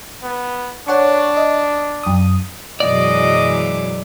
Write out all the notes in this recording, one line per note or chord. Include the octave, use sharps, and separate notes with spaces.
B3
D4 C#5 F#5 C#6
D#5
F#2 D#6
F#2 B2 E3 F#3 G#3 D5 D#5 D6